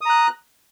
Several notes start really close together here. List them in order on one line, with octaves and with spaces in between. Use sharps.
D#6 A#5 F#6